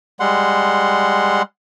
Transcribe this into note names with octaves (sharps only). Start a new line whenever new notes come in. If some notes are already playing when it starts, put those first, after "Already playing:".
G3 G#3 F#5 C6